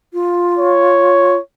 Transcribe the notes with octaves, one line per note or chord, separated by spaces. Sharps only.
F4
C#5